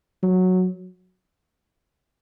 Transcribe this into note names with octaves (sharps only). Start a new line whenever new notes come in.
F#3